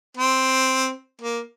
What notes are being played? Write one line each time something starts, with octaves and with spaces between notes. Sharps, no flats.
C4
A#3